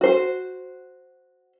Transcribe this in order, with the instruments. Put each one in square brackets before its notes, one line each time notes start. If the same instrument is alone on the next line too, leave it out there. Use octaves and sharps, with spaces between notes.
[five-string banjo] F#4 C5